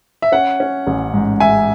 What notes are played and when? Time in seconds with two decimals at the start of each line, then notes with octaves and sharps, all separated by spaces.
0.22 E5
0.32 C#4 F#5
0.60 C#4
0.87 A1
1.14 G#2
1.40 G#2 E5 G#5